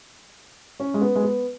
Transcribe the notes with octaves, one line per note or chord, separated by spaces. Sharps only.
C#4
G#3
B3
G#3
B3